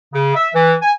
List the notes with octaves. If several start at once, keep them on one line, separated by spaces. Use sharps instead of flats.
C#3
E5
E3
G#5